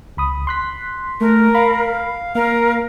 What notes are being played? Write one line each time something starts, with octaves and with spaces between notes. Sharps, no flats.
C#2 B5 D#6
C6 F#6 B6
A3 A#4
F5 B5
A#3 A#4 F5